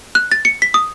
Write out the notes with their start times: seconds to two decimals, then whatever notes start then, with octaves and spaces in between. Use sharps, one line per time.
0.15 F#6
0.32 A6
0.45 C#7
0.62 B6
0.74 D#6